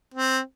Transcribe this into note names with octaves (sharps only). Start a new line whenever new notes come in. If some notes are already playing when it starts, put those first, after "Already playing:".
C4